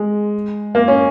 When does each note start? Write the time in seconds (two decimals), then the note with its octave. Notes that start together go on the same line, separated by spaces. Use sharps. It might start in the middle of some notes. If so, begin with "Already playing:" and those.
Already playing: G#3
0.75 A#3
0.88 C#4